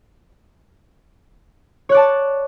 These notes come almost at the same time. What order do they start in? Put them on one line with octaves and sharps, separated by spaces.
C#5 F#6 D5 A5